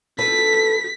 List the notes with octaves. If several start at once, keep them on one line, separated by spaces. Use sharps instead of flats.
A4 B4 B6